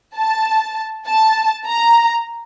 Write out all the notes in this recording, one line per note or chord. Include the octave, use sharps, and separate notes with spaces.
A5
A5
A#5